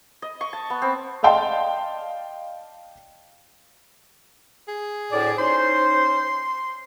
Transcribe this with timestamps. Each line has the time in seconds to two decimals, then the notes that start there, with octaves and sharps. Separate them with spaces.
0.22 D#5
0.41 C#6
0.53 A5
0.70 B3
0.82 C4
1.23 D5 D#5 F5 G5 A5 C6
4.68 G#4
5.12 D2 A2 D5
5.38 C#4 D#4 C5 C6